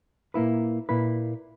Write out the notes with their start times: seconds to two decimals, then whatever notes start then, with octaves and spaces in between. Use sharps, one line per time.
0.34 A#2 A#3 E4 B4
0.89 A#2 A#3 E4 B4